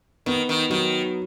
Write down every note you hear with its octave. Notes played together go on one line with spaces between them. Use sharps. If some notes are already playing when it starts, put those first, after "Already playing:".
D#3 B3
D#3
D#3 F#3